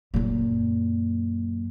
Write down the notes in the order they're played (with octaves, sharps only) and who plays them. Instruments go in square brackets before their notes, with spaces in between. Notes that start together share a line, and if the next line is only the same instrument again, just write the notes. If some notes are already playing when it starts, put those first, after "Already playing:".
[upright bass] F#2 A#2